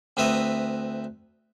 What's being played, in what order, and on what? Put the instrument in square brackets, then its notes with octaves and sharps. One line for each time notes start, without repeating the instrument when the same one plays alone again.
[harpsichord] D2 C4 B4 E5 A#5 D#6